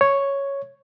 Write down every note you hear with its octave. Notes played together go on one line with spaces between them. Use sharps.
C#5